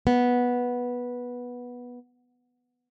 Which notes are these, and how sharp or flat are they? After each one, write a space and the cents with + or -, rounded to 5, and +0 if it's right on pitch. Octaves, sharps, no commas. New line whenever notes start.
B3 -10